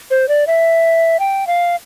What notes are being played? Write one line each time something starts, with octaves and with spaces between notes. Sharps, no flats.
C5
D5
E5
G5
F5